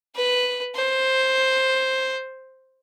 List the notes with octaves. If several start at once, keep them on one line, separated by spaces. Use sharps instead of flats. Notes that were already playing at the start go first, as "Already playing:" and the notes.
B4
C5